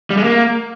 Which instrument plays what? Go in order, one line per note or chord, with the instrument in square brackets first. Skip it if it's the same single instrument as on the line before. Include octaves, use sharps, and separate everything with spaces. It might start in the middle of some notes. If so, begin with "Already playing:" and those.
[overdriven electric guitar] G3
G#3
A#3